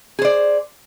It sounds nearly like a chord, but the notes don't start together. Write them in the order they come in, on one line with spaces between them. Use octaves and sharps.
G#4 C5 D5